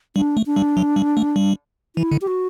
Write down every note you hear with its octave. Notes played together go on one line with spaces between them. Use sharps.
G3 D4
A3
D4
G3
F#3
G3
A3
G3
E3 E4
D3
G4
F#4